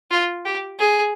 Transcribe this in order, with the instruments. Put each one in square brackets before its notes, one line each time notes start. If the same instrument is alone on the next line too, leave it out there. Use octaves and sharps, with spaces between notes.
[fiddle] F4
G4
G#4